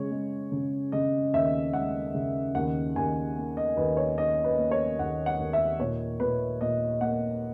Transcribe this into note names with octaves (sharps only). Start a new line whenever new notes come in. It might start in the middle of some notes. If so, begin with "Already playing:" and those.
Already playing: C#3 G#3 C#5
G#3
C#3
C#3 D#5
D#2 E5
G#3 F#5
C#3
D#2 F#5
D#2 G#5
A#3
D#5
D#2 B4
C#5
D#3 D#5
B4
A#3
C#5
D#2 F#5
F#5
D#2
E5
A#2 C#5
A#2 B4
A#2 D#5
A#3 F#5